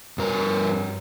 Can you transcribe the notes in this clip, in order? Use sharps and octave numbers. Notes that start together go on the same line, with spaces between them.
G2 A#4